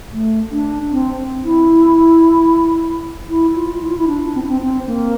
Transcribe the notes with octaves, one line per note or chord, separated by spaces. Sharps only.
A3
D4
C4
E4
E4
F4
E4
F4
E4
D4
C4
D4
C4
C4
A#3